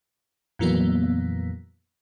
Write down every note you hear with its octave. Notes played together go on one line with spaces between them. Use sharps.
F2 A#2 E3 F#3 A#3 B3